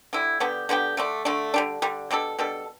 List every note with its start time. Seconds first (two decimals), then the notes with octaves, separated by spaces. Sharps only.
0.13 D3 G3 E4
0.40 D3 B3 D4 G4
0.69 D3 B3 D4 G4
0.97 D3 A3 D4
1.25 D3 A3 D4
1.54 D3 G3 D4
1.82 D3 G3 D4
2.11 B2 G3 D4 A4
2.39 B2 G3 D4 A4